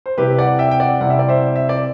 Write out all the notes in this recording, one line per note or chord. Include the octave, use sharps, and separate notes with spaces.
C5
C3 G3 C4 E4 G4 B4
D5 F#5
E5 G5
G5
D5 F#5
C3 G3 C4 E4 F#5
E5
D5
C5 E5
E5
D5